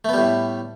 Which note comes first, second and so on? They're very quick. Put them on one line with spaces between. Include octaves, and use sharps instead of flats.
A3 B3 G3 A2